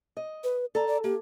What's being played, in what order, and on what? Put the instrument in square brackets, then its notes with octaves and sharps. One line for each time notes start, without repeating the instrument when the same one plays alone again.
[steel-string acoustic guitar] D#5
[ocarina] B4
[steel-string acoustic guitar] A4 A#5 [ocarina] D5
[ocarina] D5
[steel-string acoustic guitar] A#3 [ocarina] G4